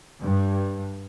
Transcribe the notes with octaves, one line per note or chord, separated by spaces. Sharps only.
G2